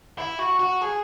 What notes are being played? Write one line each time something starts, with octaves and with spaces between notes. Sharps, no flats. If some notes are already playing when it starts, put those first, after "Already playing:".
E4
F#4
F#4
G#4